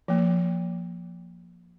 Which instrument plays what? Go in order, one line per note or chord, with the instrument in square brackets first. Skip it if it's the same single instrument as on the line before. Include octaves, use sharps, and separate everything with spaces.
[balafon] F3 A#3